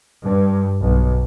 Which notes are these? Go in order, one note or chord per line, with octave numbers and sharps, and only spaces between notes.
G2
B1